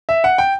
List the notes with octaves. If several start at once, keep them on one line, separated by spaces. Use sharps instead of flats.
E5
F#5
G5